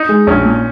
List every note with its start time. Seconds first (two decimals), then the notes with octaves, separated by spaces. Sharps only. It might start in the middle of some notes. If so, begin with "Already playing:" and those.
Already playing: D#4
0.09 G#3
0.27 A#1 C#4
0.45 A#2